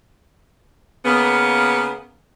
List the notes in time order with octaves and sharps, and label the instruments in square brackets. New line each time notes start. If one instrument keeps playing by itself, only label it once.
[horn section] C#3 A#3 B3